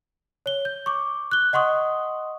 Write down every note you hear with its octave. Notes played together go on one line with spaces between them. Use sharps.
C#5 G7
G6
C#6 D6
F#6 G7
D#5 F#5 C6 C#6 D#6